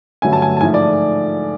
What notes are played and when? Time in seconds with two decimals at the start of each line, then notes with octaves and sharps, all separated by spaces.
0.22 G2 D3 F#3 A3 C#4 G#5
0.33 A5
0.42 G#5
0.57 A5
0.61 G#2 F3 A3 G#5
0.74 D5